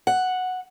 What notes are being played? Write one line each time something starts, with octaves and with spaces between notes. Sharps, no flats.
F#5